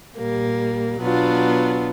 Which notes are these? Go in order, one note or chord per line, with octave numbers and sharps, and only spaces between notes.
A#2 G3 A#3
B2 F#3 B3 D4 F4